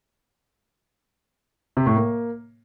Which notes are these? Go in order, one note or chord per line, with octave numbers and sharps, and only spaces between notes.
C3
A2
A#3